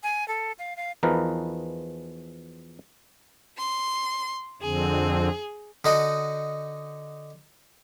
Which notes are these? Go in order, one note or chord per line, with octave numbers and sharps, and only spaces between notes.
G#5
A4
F5
F5
E2 E3 F3 D#4 A#4 B4
C6
F2 D3 C4 G#4
D3 D#4 F#4